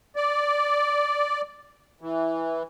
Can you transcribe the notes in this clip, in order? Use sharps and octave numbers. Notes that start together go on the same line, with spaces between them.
D5
E3